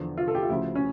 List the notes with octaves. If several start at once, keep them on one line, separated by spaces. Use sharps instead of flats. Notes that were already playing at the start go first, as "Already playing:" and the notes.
Already playing: E2 D3 F3
F4
A4
G4
F4
D2 C#3 F3 E4
C#4